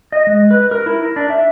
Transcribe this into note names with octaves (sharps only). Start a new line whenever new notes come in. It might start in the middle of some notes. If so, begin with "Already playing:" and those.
D#5
G#3
B4
A#4
E4
A#4
D4
E5